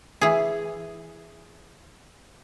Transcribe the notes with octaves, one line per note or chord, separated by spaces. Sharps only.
E3 G#4